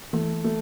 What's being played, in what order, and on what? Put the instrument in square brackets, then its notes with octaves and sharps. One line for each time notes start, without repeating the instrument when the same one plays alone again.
[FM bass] E3 [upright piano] A3
[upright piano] A3